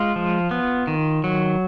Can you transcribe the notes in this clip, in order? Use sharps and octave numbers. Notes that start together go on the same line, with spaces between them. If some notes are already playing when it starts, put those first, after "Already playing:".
Already playing: G#3 F4
F3
B3
D#3
F#3